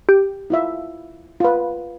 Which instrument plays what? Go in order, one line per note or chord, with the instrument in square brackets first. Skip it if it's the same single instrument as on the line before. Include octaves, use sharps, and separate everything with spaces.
[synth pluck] G4
[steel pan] E4 F4 E5
F4 B4